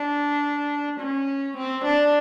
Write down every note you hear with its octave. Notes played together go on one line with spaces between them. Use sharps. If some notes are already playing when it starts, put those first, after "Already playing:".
Already playing: D4
C#4
C4
D4